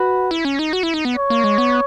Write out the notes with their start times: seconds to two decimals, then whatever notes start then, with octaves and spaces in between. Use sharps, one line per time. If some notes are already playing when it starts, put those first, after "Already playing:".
Already playing: F#4 B4
0.31 E4
0.45 C#4
0.59 D#4
0.73 F#4
0.83 E4
0.94 D#4
1.05 B3
1.16 C#5
1.30 A#3
1.44 G#3
1.58 B3